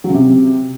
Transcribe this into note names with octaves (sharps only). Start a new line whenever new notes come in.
F#3
C#3
C3